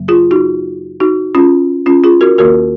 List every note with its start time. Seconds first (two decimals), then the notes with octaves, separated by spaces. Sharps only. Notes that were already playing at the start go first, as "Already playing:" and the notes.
Already playing: F#2 C#3 F#3 A#3
0.08 F4 G#4
0.31 D#4 F#4
1.00 D#4 F#4
1.35 C#4 F4
1.86 C#4 F4
2.04 F4 G#4
2.21 F#4 A#4
2.38 D#2 D#3 A#3 F#4 A#4